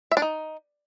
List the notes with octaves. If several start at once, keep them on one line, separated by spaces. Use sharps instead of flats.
E5
D4
D#4